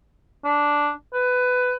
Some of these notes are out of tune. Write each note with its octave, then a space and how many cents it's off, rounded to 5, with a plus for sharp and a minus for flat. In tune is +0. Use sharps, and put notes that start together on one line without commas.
D4 -5
B4 +15